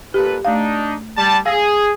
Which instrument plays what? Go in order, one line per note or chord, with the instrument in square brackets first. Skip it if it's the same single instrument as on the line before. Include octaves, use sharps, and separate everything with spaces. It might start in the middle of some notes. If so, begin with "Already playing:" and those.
[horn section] A#2 A4 B4 [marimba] G4
[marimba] A3 F5 [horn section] D4 D#4
[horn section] G3 A5
[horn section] G#4 [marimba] F5 E6 A#6